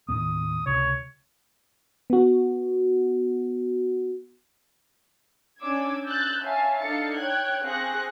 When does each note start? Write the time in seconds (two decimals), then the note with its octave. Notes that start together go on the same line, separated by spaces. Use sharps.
0.09 D#2 A2 B3 D#6
0.66 C#2 C3 C#5
2.10 B3 F#4
5.59 C#4 D4 D6 E6 G#6
6.06 E6 F#6 G6 A6
6.43 C#5 E5 F5 G#5 A5
6.81 D4 D#4 A4 F5 A6 C#7
7.17 C#5 G5 F#6 G#6
7.65 C4 G#4 F5 C#6 F#6 A#6